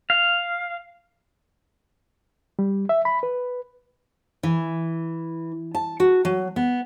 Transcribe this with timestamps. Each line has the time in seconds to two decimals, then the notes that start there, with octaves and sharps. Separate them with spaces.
0.10 F5
2.59 G3
2.89 E5
3.05 B5
3.23 B4
4.43 E3
5.75 A5
6.00 F#4
6.25 F#3
6.56 B3